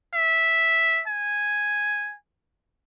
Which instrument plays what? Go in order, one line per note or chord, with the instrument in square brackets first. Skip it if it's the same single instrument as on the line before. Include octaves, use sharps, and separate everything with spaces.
[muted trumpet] E5
G#5